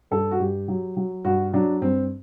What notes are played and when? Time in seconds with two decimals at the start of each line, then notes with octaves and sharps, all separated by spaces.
0.11 G2 A4
0.31 F#4
0.40 G2 G4
0.68 F#3
0.97 F#3
1.24 G2 F#4
1.53 F#3 D4
1.81 G2 C4